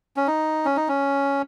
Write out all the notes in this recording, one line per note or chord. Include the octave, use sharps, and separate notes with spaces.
C#4
D#4
C#4
D#4
C#4